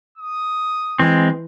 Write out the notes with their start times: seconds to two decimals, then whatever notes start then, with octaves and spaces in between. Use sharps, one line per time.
0.18 D#6
0.99 E3 G#3 C4